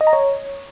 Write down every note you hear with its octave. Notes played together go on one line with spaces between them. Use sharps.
D#5
A#5
C#5